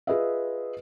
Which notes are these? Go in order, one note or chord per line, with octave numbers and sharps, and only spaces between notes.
F4 G#4 B4 D#5 E5